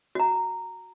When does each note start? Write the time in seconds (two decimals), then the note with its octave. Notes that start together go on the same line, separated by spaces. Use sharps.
0.15 F#4 A#5